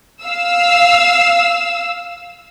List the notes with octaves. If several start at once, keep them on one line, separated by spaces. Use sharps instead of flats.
F5 E6